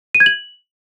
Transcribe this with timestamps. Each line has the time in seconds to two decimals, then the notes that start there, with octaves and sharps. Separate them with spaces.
0.15 D#7
0.20 G#6
0.26 F#7